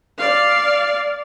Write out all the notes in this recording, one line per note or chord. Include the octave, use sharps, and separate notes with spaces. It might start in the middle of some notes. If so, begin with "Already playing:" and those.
D5 F5